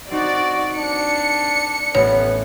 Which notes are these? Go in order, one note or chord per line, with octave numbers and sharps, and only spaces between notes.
C4 D#4 F#4 D5
D4 C#7
A1 B3 C#5